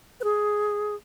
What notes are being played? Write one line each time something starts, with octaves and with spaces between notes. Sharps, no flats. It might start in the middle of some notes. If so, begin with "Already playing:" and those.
B4
G#4